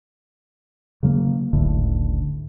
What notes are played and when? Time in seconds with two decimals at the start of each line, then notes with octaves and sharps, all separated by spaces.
1.03 C#3 F#3 G3 A#3
1.53 F#1 C#2 A2 D3